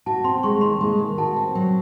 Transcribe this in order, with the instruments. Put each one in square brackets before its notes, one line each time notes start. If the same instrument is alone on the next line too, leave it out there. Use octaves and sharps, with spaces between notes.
[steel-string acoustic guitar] F#4 [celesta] A5
[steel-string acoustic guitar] C4 [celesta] C6
[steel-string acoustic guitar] G#3 [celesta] C#6
[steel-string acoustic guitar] D#2 [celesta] C6
[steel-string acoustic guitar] G#3
D#3
[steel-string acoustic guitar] F#4 [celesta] A5
[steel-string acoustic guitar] C4
F#3